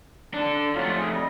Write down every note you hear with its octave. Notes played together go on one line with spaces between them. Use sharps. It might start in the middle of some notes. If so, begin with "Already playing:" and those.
D4 A4
F2 F#3 A3 F4
G#4
G3 D#5